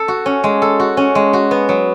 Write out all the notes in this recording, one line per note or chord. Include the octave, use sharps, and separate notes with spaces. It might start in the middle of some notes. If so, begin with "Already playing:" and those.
Already playing: A4
F#4
C#4
G#3
A4
F#4
C#4
G#3
F#4
B3
F#3